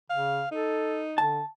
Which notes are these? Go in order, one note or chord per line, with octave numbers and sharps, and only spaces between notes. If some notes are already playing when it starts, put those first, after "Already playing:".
C#3 F5
D#4 A4
D3 A5